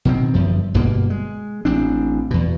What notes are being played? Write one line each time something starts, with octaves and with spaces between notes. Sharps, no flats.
B2 D#3 C4
G1 F#2 F3
G1 G2 B2 A#3
G#3
A1 C4 D4
E2 B2